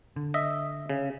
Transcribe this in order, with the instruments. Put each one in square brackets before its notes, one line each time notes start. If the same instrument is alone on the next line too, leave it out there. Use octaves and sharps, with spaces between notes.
[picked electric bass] D3
[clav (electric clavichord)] D#5 E5
C#3